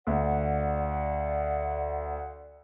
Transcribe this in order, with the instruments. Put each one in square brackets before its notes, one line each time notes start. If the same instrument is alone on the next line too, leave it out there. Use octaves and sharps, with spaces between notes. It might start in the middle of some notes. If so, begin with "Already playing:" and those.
[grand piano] D2 [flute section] D5 F5 F#5